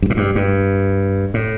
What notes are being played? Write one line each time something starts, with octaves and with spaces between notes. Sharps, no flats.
G2
A2
G2
G2
A2